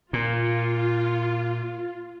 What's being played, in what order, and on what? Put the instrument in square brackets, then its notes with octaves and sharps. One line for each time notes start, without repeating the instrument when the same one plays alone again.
[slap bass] A#2 [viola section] F4